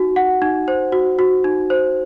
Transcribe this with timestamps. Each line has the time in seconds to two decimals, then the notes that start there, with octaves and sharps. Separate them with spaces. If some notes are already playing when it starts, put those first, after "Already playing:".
Already playing: D#4 F#4
0.16 F#5
0.42 D#4
0.68 C5
0.92 F#4
1.19 F#4
1.44 D#4
1.70 C5